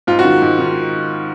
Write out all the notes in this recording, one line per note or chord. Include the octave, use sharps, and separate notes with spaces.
G#2 F4
F#4
D#3
G#2
D#3